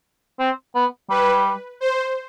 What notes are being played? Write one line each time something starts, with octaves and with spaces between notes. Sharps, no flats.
C4
B3
G3 B4
C5